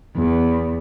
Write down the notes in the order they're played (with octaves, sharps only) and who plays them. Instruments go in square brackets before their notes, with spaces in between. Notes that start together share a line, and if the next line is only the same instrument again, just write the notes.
[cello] E2